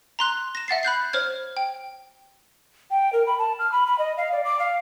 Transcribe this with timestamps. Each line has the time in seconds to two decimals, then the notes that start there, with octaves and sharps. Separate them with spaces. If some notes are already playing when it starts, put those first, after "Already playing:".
0.19 A#5 C6 F#6
0.55 A#6 E7
0.68 E5 F#5 A6 C7
0.83 B5 F#6 G6 C7
1.13 C5 C#5 F6 G#6
1.57 G5
2.91 G5
3.13 A#4
3.27 B5
3.39 A5
3.59 F6
3.72 B5
3.87 B5
3.99 D#5
4.17 F5
4.32 D5
4.45 D6
4.59 F5